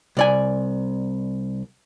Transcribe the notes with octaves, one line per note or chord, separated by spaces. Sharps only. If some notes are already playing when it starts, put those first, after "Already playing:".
C2 D5 G#5